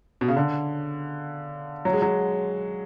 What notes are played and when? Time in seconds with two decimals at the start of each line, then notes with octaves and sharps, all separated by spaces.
0.21 B2
0.28 C#3
0.37 D3
1.85 F#3
1.93 G#3
2.02 F#3